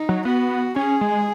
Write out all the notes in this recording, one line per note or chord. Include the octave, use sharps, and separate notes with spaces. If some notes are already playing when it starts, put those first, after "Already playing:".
Already playing: D#4
F#3
B3 F#4
C#4 G#4
G#3